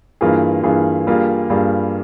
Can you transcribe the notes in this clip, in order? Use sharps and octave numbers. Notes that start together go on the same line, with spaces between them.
G2 E3 A#3 F4 G#4
G2 E3 A#3 F4 G#4
G2 G3 A#3 F4 G#4
G2 G3 A#3 F4 G#4